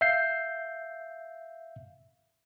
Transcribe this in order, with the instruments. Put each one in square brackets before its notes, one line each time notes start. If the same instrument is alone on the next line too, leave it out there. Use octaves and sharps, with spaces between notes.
[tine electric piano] E5 F5 G6 C7